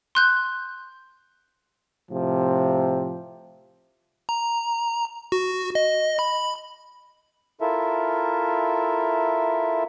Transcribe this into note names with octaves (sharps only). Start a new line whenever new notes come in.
C6 F#6 G6
A2 C3 F3
A#5
F#4
D#5
B5
E4 F4 A4 A#4 E5